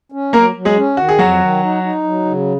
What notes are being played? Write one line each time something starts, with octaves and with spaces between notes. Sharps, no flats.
C#4
F#3 A#3 A#4
F#3
G#3 G#4
C#4
D#3 F#4
G#4
F2 F#3 F#4
D#3
D#4
D#4
F#3
C#3